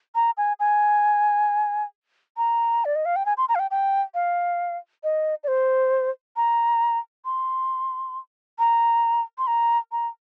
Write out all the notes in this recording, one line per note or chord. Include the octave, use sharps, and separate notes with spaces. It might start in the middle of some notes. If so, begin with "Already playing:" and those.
A#5
G#5
G#5
A#5
D5
D#5
F5
G5
G#5
C6
A#5
F5
G5
G5
F5
D#5
D5
C5
A#5
C6
A#5
C6
A#5
A#5